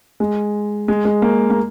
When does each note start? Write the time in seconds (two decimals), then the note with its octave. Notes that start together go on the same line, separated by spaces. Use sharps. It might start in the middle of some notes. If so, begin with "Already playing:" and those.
0.20 G#3
0.88 G#3
1.05 G#3
1.22 A#3
1.50 A#3